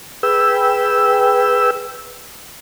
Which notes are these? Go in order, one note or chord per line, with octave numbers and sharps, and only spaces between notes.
G#4 B4 G5 E6